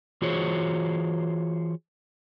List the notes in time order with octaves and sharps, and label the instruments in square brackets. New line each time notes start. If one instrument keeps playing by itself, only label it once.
[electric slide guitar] E3 F4 F#4 G#4 C5 C#5